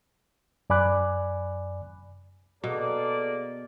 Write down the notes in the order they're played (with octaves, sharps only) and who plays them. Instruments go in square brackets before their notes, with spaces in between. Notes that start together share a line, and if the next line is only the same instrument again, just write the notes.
[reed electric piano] F#2 D5 G#5 B5 D6 F#6
[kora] B2 [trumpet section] A#3 D5 [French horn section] G#4 A4